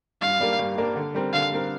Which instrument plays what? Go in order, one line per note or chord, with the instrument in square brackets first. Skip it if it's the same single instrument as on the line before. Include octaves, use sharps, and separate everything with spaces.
[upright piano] G2 [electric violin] F5
[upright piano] G3 A#3 D4 A#4
G2
G3 A#3 D4 A#4
D3
G3 C4 A#4
[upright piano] D3 [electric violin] F5
[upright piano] G3 C4 A#4